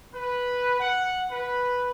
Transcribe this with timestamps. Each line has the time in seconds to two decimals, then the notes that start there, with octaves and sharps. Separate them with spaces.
0.14 B4
0.80 F#5
1.31 B4